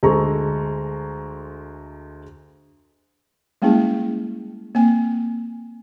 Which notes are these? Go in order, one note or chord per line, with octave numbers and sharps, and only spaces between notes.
D2 G#3 A4 A#5 C#6
G3 G#3 A#3 C#4 E4 G#4
A#3 C4 G#5